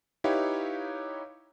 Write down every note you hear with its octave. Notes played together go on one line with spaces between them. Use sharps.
D#4 E4 G4 B4 C#5 F5